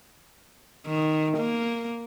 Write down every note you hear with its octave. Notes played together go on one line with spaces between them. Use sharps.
D#3
A#3